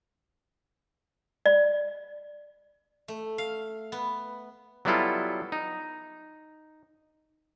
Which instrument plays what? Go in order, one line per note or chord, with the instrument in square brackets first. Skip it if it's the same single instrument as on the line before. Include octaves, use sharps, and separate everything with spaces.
[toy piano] D5
[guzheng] A3
F5
B3
[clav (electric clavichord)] F#3 G3 B3 E4 F4 A4
D#4